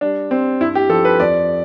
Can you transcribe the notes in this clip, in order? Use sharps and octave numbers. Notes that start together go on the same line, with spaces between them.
G3 D4
G3 C4
G2 E4
G4
F3 A4
B4
F2 D5